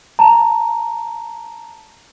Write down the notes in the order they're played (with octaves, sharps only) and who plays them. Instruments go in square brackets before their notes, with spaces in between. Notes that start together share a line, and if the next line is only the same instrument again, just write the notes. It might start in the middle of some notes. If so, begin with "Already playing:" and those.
[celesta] A5 A#5